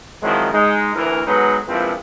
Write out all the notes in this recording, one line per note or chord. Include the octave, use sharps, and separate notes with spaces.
D#3 F3 F#3 G#3 C4 E4
G#3 D#4
D2 E3 A#4
F#3 G#3 B3 D#4 A4 B4
A#1 G#2 F3 C4 E4 B4